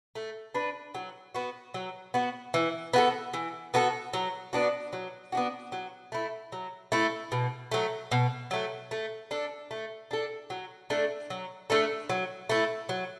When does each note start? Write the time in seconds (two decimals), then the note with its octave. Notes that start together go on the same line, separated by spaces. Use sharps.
0.15 A3
0.55 D4 B4
0.95 F#3
1.35 B3 F#4
1.74 F#3
2.14 B3 F#4
2.54 E3
2.94 B3 F#4 A4
3.34 E3
3.74 B3 F#4 A4
4.13 F#3
4.53 B3 D4 F#4
4.93 F#3
5.32 B3 D4 F#4
5.72 F#3
6.12 A3 E4
6.52 F#3
6.92 A3 E4
7.32 B2
7.71 F#3 A3
8.11 B2
8.51 F#3 A3
8.91 A3
9.31 D4 A4
9.71 A3
10.11 D4 A4
10.50 F#3
10.90 A3 D4 A4
11.30 F#3
11.70 A3 D4 A4
12.10 F#3
12.49 A3 E4
12.89 F#3